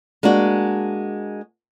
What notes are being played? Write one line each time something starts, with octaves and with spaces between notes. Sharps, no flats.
G#3 A#3 D4 F#4